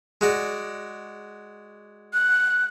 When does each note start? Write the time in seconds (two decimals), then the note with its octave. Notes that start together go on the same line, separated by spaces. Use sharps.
0.21 G#3 F#4 D5
2.13 F#6